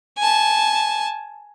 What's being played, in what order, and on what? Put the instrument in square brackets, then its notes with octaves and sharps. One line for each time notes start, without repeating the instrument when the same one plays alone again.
[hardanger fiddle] G#5 A5